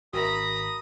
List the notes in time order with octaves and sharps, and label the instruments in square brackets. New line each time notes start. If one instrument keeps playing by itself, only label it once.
[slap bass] G#1 [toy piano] F#4 A#4 E5 [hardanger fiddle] A#5 B5 [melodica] D#6